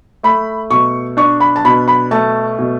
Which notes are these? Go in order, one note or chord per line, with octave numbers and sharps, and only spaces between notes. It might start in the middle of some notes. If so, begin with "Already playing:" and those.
A3 B5
B2 C#6
D4 C#6
B5
A5
B2 B5
B5
A3 A5
B2